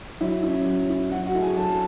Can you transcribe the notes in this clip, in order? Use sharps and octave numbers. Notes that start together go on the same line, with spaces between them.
F#3 E4 E5
C#4 E4
F#3
C#4 E4
F#3 F#4 F#5
F#4 F#5
A3 E4
G#4 G#5
F#3 A4 A5